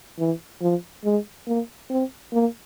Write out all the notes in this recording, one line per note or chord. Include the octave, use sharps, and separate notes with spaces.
E3
F3
G#3
A#3
C4
A#3